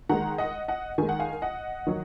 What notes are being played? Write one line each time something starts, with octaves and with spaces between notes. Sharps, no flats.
D#3 G#3 F#5 A#5
D#5 F#5
D#5 F#5
D#3 G#3 G#5
F#5
F5 G#5
D#5 F#5
D#3 F#3